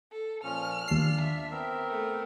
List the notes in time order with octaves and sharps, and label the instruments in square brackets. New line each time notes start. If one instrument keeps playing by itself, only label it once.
[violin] A4
[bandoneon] A#2 F3 C#4 [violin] F6
[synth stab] D#2 C7 [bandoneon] D4 F4
[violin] E5
[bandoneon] B3 C4 A#4
[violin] A3